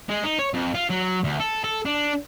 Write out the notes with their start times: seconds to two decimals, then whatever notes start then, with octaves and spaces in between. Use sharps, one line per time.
0.09 G#3
0.24 D#4
0.39 C#5
0.54 F2
0.75 F4
0.90 F#3
1.24 D2
1.40 A4
1.64 A4
1.85 D4